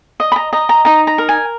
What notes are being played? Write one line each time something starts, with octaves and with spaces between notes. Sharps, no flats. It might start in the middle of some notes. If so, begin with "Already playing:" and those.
D#5
B5
A#5
D#5 A#5
A#5
D#4 A#5
A#5
A#4
G#5